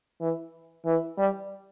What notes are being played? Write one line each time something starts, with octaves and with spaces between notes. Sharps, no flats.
E3
E3
G3